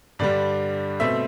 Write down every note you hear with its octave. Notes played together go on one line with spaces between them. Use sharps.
G2 D3 G3 D5
B2 A3 C4 E5